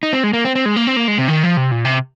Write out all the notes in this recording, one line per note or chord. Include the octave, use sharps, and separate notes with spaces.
D#4
C4
G#3
A#3
C4
C4
G#3
A#3
C4
A#3
G#3
C3
D#3
F3
C3
A#2
C3